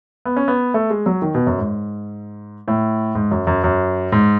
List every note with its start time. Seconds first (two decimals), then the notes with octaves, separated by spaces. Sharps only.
0.25 B3
0.36 C#4
0.48 B3
0.74 A3
0.90 G#3
1.06 F#3
1.22 D#3
1.35 B2
1.47 F#2
1.58 G#2
2.68 A2
3.15 G#2
3.31 F#2
3.47 F#2
3.64 F#2
4.12 G#2